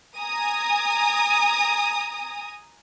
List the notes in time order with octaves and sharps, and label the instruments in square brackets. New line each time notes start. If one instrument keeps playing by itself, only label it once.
[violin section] G#5 A#5 D#6